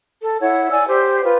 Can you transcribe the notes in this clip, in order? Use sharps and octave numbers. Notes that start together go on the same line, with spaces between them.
A4
E4 C#5 F#5
D5 G#5 E6
G4 C5
F4 B4